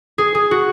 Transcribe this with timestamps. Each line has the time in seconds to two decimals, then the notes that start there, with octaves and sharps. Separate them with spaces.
0.18 G#4
0.35 G#4
0.51 F#4